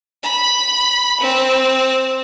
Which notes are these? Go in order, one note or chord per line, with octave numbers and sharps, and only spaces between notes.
B5
C4